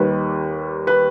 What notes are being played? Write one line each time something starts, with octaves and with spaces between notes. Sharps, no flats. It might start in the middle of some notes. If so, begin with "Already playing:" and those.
Already playing: D#2 D#3 G3 B4
B4